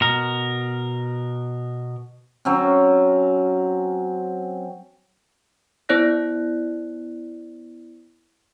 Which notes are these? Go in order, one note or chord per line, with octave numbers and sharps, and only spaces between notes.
B2 A#4
F#3 C4 C#4
B3 E4 C5 D5 F#6 A#6